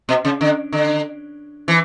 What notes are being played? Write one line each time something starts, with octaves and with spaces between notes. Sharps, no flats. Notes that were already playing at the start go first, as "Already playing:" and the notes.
B2
C#3
D3
D3
E3